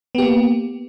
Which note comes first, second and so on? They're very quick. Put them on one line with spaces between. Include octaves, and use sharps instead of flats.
B3 G4 A#3